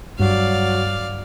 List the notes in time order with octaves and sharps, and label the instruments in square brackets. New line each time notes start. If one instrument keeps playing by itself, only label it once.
[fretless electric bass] G2 [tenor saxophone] F#3 [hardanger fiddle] D5 F5